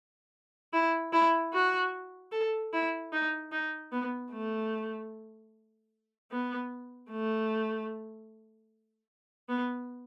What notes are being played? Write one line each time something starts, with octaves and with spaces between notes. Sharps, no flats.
E4
E4
F#4
A4
E4
D#4
D#4
B3
A3
B3
A3
B3